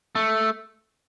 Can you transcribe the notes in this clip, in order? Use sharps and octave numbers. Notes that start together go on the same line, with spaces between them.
A3